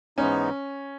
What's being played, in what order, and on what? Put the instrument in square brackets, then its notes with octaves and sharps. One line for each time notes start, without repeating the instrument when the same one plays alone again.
[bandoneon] G#2 E3 G#3 B3 D#4 [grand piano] C#4